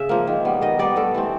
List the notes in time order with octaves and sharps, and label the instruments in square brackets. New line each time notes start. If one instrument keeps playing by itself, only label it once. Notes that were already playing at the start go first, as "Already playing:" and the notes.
Already playing: [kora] C#3 E5
F3 A#3
D#3
G3 B3
D#3 D#5
G3 B3 D5
G2 A4
E3 A3 C4